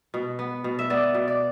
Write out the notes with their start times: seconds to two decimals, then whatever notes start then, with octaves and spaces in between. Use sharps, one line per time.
0.14 B2
0.39 B3
0.64 B2
0.79 E5
0.90 B3 D5
1.14 B2
1.28 D5